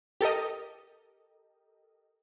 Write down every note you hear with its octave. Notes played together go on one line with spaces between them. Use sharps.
G4 A4 A#4 D#5